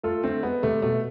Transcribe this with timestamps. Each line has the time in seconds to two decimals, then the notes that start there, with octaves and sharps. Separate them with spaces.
0.03 A3 F4 A4
0.23 D3 A3 C4
0.43 G#3 B3
0.63 C3 A3
0.82 B2 A3